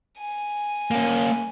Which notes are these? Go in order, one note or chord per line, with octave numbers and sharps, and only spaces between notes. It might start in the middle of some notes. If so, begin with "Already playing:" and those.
G#5
A#3 C#4